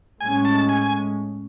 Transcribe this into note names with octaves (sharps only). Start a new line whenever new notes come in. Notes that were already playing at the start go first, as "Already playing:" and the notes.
A2 G#3 C#4 G#5
A5
G#5
G#5